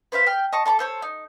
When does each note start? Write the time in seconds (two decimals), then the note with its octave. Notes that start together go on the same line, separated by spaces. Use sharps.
0.12 B4 C5 E5 F5
0.26 G5 F6
0.53 D#5 A5 C#6
0.66 A4 A5 B5 D6
0.79 A4 C5 C#5
1.02 D#4